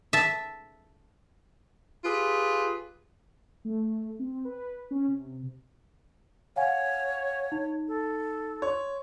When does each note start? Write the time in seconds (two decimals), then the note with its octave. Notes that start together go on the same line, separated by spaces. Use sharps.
0.13 E5 A5
2.04 F4 G4 G#4 B4
3.65 A3
4.19 C4
4.45 B4
4.91 C#4
5.08 C3
6.56 C#5 F5 F#5 G#5
7.52 D#4
7.88 A4
8.62 C#5 C6